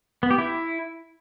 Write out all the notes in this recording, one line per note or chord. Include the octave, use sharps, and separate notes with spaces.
B3
G4
E4